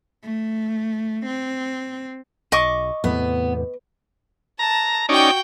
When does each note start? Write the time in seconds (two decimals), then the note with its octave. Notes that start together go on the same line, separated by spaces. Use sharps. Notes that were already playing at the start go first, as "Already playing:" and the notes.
0.24 A3
1.26 C4
2.52 B1 D#5 C#6 D6
3.04 E2 A2 C3 B3
4.59 A5 A#5
5.09 C#4 D#4 F#4 D5 G5